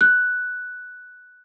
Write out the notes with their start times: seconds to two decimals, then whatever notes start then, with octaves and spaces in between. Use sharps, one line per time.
0.01 F#6